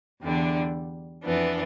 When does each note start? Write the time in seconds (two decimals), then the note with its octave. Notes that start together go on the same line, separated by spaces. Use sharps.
0.22 E2 D3 G3 D4
1.24 F2 E3 B3 D4